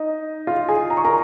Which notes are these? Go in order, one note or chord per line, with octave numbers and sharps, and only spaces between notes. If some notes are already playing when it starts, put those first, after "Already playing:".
Already playing: D#4 D#5
F4 F5
G#4 G#5
A#5
C#6
A#4 A#5